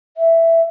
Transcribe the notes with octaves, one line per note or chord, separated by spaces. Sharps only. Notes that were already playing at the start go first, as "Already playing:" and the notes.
E5